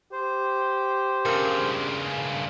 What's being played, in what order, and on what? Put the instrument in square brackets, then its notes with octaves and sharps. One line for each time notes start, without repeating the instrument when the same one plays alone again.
[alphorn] G4 [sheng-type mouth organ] C5
[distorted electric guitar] G2 C#3 [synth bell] A#4 C6 F6